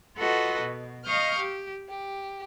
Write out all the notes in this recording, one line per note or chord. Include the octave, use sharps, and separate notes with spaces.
F4 F#4 A4 B4 D#5 F#5
B2
D#5 F5 C#6 D#6 F6 G6
G4
G4